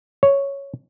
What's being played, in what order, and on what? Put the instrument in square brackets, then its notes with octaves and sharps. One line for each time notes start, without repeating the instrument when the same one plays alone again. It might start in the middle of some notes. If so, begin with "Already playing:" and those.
[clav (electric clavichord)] C#5